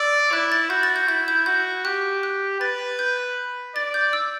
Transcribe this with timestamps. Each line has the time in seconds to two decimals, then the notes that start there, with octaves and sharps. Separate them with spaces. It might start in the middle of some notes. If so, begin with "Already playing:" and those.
Already playing: D5 E6
0.32 E4 F#6
0.52 A6
0.70 F#4 G6
0.83 A6
0.96 G6
1.08 E4 G6
1.28 G6
1.46 F#4 G6
1.85 G4 F#6
2.23 F#6
2.60 B4 A6
2.99 G6
3.75 D5 A6
3.94 G6
4.13 E6